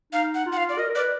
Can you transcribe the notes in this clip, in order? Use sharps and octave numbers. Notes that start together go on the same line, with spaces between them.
D#4 F5
F#5
F4
F#5
F5
D5
A#4 D#5
A#4
B4 D5